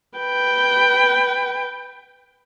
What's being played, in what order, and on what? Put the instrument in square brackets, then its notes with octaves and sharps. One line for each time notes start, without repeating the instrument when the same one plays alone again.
[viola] B4 G5